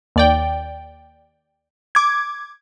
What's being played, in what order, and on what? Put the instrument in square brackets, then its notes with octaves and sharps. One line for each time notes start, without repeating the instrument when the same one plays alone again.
[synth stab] D#2 D5 G5
D6 G#6